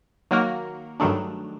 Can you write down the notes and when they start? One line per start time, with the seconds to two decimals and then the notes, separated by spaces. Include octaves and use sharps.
0.31 D#3 F#3 A#3 F#4 A#4
1.00 G2 D#3 F#3 A3 D4